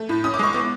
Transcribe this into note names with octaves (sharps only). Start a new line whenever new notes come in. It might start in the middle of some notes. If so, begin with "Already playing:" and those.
Already playing: A3
A2
C#4 D#6
D6
G#3 C#6
B3 D6